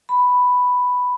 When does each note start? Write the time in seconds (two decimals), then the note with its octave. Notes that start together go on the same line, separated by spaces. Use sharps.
0.09 B5